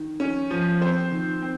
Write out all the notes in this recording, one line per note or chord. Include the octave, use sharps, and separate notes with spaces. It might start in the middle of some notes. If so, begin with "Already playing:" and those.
Already playing: D#3
C#4
F3
C4 C5
D#3
C4